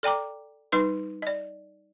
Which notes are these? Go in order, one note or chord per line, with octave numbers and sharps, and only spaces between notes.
A4 D5 G5 A#5 D6
G3 D#4 B4 C6
D5 D#5